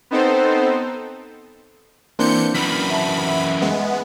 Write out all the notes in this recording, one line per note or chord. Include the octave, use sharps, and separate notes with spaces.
B3 C4 D#4 A4 C5
E3 A#3 C4 D4 C6 G6 C#7
F#2 E3 B5 B6 F#7
E5 A5
E5
G#3 B3